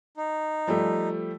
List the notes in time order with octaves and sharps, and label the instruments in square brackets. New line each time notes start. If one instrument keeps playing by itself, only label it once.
[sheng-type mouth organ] D#4
[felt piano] F3 G3 A3